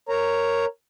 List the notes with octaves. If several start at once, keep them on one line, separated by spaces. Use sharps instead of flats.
A#4 C#5 A#5